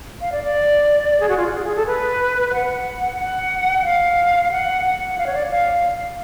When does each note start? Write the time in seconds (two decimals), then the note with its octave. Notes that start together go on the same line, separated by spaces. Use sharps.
0.21 F5
0.32 D5
0.43 D5
1.20 G#4
1.29 F#4
1.37 F4
1.54 G#4
1.60 F#4
1.64 G#4
1.76 A4
1.86 B4
2.53 F#5
3.19 F#5
3.81 F#5
3.85 F5
4.51 F#5
4.85 F#5
5.18 F5
5.26 C#5
5.34 D5
5.51 F5